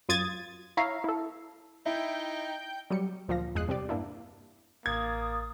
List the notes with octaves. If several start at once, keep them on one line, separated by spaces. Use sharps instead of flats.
F#2 F4 D#6 G#6 A6
E4 C#5 E5 F5 A#5
E4 A4
D#4 E4 G5 G6
F#3 G3 C#7
D2 A#2 F3 F5 A#6
G1 E2 G#3 D#6 F#6 C7
C2 C4 G4 D5
G2 A#3 D4 E4
A1 A#3 D#6 G#6 A6